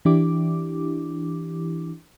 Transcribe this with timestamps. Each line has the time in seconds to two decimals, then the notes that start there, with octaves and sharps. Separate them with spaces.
0.05 E3 D4 E4 G4 D6